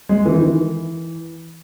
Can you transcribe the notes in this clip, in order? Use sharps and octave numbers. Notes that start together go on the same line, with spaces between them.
G#3
E3
D#3
E3